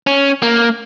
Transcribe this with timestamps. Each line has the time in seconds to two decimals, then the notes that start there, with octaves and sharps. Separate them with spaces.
0.07 C#4
0.43 A#3